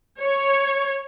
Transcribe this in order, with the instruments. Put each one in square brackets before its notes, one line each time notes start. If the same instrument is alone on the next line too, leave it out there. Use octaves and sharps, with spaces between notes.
[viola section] C#5